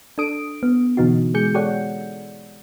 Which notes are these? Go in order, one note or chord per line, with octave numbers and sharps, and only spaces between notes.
D4 A4 D#6 D7
B3
B2 D3 E3 B3 D#4 F#4
G#3 G#4 G6 C#7
G4 A4 C#5 D5 F#5